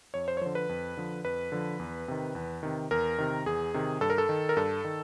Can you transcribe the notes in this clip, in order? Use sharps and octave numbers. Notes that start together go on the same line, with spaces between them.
F2 C#5
C5
C#5
D3 F3 C5
B4
F2
D3 F3
F2 B4
D3 F3
E2
C3 D#3
E2
C3 D#3
E2 A#4
C3 D#3
E2 G#4
C3 D#3
G2 A4
A#4
A4
D#3
A#4
G2 A4
D#3